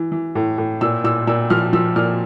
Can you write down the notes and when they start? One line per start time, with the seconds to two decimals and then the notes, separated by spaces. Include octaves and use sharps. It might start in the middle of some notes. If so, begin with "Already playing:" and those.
Already playing: E3
0.12 E3
0.35 A2
0.58 A2
0.81 A#2 E6
1.04 A#2 E6
1.27 A#2 E6
1.50 F3 F6
1.73 F3 E6
1.96 A#2 F6